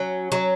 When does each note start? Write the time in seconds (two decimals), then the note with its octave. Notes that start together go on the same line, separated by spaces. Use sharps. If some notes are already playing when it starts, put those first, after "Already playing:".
Already playing: F#3 C#4
0.32 F#3